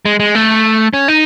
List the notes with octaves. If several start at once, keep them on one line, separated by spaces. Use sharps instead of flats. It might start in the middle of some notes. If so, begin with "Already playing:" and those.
G#3
G#3
A3
C#4
D#4